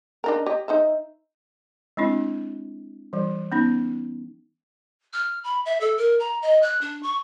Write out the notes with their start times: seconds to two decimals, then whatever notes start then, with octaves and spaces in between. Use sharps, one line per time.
0.24 D4 D#4 A#4
0.46 G4 C#5 D#5
0.68 D#4 C5 E5
1.97 G#3 C4 D4 E4
3.13 E3 G3
3.52 B3 C#4 D#4
5.13 F6
5.44 B5
5.65 E5
5.81 A4
5.98 A#4
6.20 A#5
6.42 D#5
6.62 F#6
6.81 D4
7.03 C#6